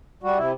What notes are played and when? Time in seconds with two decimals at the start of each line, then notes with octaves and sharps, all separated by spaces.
0.23 G3 F#4
0.37 C3 E4